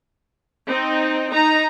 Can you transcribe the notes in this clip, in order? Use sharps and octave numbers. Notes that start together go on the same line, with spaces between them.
C4 D#4
D#4 A#5